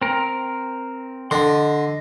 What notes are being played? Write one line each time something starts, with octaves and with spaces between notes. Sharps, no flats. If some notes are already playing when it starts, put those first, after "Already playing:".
C4 A#4
D3 D#5 C6